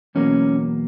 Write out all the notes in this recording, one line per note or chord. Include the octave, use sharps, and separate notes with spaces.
E2 B2 F#3 A#3 C#4